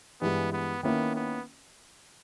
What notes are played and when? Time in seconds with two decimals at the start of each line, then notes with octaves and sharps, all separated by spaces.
0.21 G2 E3 G#3 B3
0.53 B3
0.83 D#3 A#3 B3 C#4 E4
1.15 B3